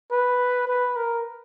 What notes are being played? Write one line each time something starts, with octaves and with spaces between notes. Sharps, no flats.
B4
B4
A#4